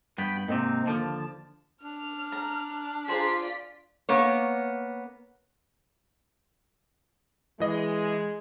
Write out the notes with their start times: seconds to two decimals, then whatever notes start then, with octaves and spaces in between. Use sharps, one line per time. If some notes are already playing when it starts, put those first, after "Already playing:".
0.18 G2 B3 G5 B5
0.48 G#2 C3 A#3 C4 D#4
0.85 D#2 D3 F3 A5
1.83 D4 F6
2.32 A#5
3.08 F4 G#4 C5 D5 A#5 B6
4.09 A#3 B3 C#5
7.60 E3 G#3 D#5